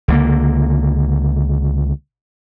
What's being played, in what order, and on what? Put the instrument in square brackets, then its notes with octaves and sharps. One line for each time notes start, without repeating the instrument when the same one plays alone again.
[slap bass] C#2 D3 A#3